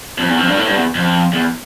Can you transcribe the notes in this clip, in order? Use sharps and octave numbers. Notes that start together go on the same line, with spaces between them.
F2
E2
F2
G2
A2
G2
E2
F2
E2